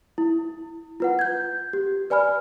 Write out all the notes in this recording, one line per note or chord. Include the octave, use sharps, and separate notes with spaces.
E4
F4 B4 F#5
G6 G#6
G4
B4 D5 G#5 B5 F6